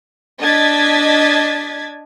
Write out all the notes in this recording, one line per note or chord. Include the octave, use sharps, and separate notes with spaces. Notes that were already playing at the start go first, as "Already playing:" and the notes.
D4 D#5 G#6 A6 B6